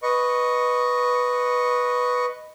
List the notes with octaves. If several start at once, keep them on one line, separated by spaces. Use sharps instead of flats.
B4 D#5 C#6